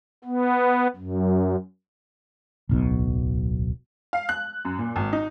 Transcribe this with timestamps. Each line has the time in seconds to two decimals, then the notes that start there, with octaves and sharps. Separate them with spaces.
0.24 B3
0.96 F#2
2.69 D1 B1 B2
4.13 F5
4.29 F#6
4.65 F#2
4.79 A#2
4.96 G#1
5.13 D#4